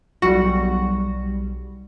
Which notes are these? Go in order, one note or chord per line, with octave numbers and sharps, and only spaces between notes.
B1 G3 F#4